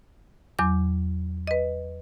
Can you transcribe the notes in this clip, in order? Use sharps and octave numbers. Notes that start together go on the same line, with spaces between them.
E2 F#3 D6
B4 D#5